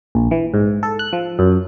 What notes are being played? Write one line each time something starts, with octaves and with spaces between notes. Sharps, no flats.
A#1
E3
G#2
A4
F#6
F3
F#2